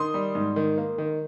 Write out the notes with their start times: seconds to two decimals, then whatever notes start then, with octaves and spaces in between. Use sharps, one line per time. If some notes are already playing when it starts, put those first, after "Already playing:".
Already playing: D#3 C6 D#6
0.14 G3
0.35 G#2
0.56 D#3
0.78 A#3
0.98 D#3